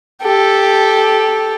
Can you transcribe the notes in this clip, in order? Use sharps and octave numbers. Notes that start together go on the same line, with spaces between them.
G4 A4